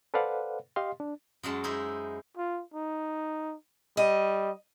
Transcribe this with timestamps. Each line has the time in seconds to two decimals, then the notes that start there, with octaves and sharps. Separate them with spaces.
0.14 A4 B4 C5 D5 F5 F#5
0.76 G4 D#5 F5 C6
1.00 D4
1.43 F#2 F#3 G#3 A5
1.64 D#4 E4 G#4 C5
2.37 F4
2.74 D#4
3.97 G3 D#5